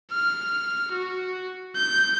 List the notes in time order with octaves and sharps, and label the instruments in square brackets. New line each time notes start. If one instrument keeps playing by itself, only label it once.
[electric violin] F6
F#4
G6